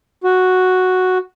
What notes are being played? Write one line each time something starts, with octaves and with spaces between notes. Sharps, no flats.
F#4